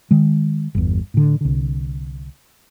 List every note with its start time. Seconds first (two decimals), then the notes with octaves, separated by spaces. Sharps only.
0.11 D#3 G#3
0.75 G1 E2
1.14 A2 D3
1.41 C2 D3